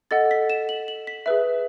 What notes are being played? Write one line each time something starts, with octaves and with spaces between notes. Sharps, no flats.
A4 D#5 F#5 A6
B6
E7
F#7
F#7
B6
G#4 B4 E5